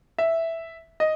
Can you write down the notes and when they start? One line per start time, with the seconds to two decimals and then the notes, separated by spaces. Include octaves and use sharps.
0.18 E5
1.00 D#5